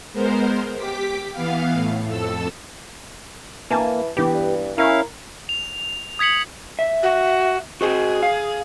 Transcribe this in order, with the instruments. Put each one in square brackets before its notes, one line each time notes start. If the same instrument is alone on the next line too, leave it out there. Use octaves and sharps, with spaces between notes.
[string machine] G#3 B3 A#4 C5
G4 D6 B6
E3 B3 F5
A2
F2 A4 E6
[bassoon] E3 [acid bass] A#3 [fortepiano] G#5 A5
[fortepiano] E3 B3 [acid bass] G4
[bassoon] G2
[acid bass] C#4 [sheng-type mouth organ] E4 F5 [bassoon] A#4
[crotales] F7
D#6 G#6 B6 C#7 F#7
[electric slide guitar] E5
[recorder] F#4
[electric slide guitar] F#4 C5 D#5 [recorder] G#4
[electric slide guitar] F5